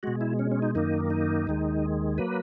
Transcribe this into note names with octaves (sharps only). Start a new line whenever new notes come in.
B2 G#3 F#4
E4
C#4
C#4
D#4
F#2 D#3 A#3 D#4
D#4
D#2 D#3 G#3
F#3 A#3 B4